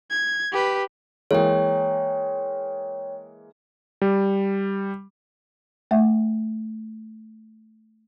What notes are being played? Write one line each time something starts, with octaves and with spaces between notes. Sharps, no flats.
G#6
G4 B4
E3 G#3 A#3 C#5 G5
G3
A3 E5 F#5